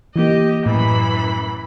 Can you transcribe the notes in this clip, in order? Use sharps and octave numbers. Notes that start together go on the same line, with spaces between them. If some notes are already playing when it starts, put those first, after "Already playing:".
E3 A#3 G4 D#5
F#2 A2 E3 B5